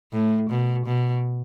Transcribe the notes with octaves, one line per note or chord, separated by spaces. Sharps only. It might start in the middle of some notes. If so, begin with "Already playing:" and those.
A2
B2
B2